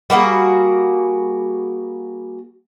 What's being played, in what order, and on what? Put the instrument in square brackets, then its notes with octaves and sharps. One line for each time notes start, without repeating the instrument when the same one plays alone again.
[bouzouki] G3 A#3 F#4 G#4